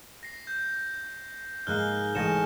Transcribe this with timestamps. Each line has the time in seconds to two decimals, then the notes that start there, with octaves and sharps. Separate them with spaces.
0.23 A#6 C7
0.47 G6
1.67 G#2 G#3 A#3 F6 F#6 G7
2.15 A1 G#3 G#5 A#6 C#7 E7